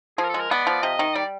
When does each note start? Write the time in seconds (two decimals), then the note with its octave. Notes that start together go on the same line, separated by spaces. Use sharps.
0.18 F3 G#4
0.24 A#4
0.29 A4
0.34 G#3
0.40 A#4
0.51 B3 D5
0.67 F3
0.83 C3 D#5
0.99 D#3
1.15 G3 D5